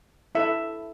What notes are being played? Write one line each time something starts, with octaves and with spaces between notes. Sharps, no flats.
E4 A4 E5